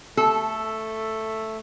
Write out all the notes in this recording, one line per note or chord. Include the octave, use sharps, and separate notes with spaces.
A3 A4